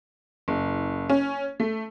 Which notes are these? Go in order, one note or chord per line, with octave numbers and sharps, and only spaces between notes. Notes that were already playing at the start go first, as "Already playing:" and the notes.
F#1
C#4
A3